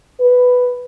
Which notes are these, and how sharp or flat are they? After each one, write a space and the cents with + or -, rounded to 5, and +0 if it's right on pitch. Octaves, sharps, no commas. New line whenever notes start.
B4 +5